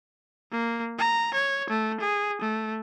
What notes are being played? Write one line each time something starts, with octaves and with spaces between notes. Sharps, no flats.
A#3
A#5
C#5
A3
G#4
A3